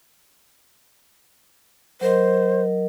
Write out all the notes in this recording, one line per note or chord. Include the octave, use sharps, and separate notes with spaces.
F#3 A#4 C5 D#5